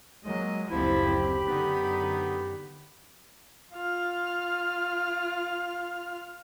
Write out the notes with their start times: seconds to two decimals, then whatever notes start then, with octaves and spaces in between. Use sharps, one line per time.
0.25 F#3 G#3 A#3 D#5
0.71 F#1 D2 F3 C4 E4 G4 B5
1.46 F#2 D3 B3 D#4
3.74 F4 F6